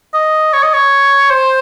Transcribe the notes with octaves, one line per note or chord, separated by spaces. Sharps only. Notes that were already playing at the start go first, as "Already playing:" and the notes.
D#5
C#5
D#5
C#5
C5